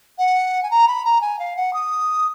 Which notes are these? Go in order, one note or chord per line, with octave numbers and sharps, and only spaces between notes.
F#5
G#5
A#5
B5
A#5
G#5
F5
F#5
D#6